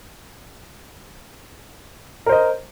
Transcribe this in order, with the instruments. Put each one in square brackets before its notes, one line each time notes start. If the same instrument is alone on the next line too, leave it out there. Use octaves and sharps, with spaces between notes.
[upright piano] A#4
C5
D#5